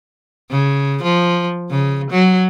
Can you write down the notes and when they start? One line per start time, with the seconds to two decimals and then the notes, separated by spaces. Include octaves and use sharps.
0.50 C#3
1.03 F3
1.70 C#3
2.11 F#3